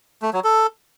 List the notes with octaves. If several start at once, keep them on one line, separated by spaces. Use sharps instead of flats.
A3
F#3
A4